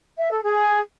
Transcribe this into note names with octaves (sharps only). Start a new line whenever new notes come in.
E5
A4
G#4